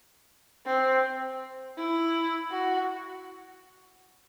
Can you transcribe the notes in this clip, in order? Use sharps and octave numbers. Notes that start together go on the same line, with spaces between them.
C4
E4
F#4